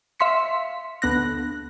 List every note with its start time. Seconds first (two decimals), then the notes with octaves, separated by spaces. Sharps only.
0.20 E5 F5 C6 B6 C#7
1.02 D2 B3 F#6 A#6